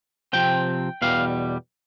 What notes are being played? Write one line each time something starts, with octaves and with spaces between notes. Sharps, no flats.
C3 F3 C4 G5
E2 B2 G3 F5